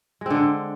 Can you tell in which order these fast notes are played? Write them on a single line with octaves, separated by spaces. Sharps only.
G#3 C4 D3